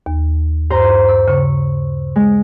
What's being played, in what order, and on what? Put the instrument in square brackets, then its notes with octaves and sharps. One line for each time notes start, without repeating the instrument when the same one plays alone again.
[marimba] D#2
[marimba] G2 [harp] C5 A#5
[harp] E6
[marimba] C#3 [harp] C#6
[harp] G#3